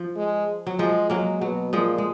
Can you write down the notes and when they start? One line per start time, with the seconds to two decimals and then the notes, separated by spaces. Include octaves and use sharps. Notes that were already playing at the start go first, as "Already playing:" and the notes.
Already playing: F3
0.16 G#3
0.67 F#3
0.79 F3 G#3
1.10 F#3 G#3 A#3
1.41 B2 F#3
1.73 A#2 F3 G#3
1.98 G#3